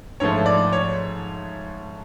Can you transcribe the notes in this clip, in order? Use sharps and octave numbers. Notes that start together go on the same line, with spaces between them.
G#2 F3 A3 C#5
D5
C#5